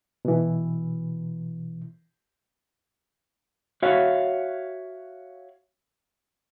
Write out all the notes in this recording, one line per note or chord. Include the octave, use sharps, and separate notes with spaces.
B2 E3
F#4 C#5 E5 F5